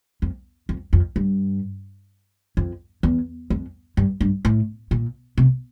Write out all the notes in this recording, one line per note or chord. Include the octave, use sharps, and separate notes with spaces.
F2
F2
F2
G2
F2
E2
F2
G2
G2
A2
A#2
C3